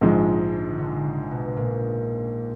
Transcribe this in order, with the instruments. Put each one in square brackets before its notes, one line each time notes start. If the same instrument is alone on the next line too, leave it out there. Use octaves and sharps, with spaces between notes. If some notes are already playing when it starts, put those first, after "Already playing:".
[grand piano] A#1 G#2 F3 G#3 [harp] D3
[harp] D#3
D3
D3
C#3
B2
A#2